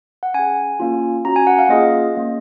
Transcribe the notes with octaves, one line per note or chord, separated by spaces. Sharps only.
F#5
C#4 G#4 G#5
A#3 C#4 F4
C#4 F#4 A#5
G#5
F#5
F5
A#3 C#4 F4 G#4 D#5
A#3 C#4 G#4